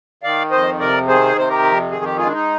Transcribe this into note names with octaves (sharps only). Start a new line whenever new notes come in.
D#3 D5 F5
F2 C5 D#5
C3 A#4 D5
D#3 G#4 C5
C3 C5
G4 A#4
F2
D#3 G#4
G4
G#3 F4 G#4
D4
D#4